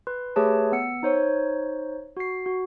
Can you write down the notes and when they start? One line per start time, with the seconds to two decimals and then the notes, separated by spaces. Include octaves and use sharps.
0.07 B4 C6
0.36 A3 G4 G#4 B4 C#5 A5
0.72 B3 E6 C#7
1.03 D#4 C5 C#5
2.17 F#4 C7
2.46 F#4